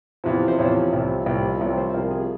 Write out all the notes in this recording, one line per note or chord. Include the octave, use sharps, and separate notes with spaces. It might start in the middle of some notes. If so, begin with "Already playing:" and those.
E2 C3 F3
C5
E2 C3 F3 C#5
C2 C3 F3
C2 C3 F3
C2 C3 F3 C#5
C5
C2 C3 F3 A#4
G#4